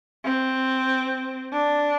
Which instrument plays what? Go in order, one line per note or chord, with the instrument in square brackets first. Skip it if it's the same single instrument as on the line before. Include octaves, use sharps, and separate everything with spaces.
[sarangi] C4
D4